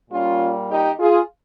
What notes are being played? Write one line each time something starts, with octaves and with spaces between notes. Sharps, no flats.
A#2 G3 A#3 C#4 F4
D#4 G4
F4 G#4